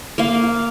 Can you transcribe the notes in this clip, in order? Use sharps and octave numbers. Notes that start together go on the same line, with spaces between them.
A#3 F5